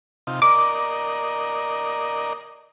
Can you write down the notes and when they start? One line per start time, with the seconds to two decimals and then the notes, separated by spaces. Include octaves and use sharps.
0.27 C3 D#4 F4
0.42 A#4 D5 D#5 D6